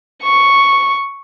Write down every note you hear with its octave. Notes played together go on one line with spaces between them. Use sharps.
C#6